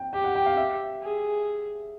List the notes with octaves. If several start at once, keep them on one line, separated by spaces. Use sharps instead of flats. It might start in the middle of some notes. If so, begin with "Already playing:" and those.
Already playing: G5
G4 G5
F#5
G5
F5
E5
G#4